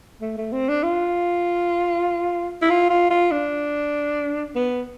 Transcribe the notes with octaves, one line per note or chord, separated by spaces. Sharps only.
A3
A3
C4
D4
F4
E4
F4
F4
F4
D4
B3